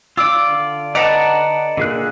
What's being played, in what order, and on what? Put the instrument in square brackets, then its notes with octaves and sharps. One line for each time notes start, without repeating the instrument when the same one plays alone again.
[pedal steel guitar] F4 D5 [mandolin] D6 E6
[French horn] D3
[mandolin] B4 D#5 A#5 [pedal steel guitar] D5 F#5 A5
[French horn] A#2 [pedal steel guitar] D3 G#4 F#6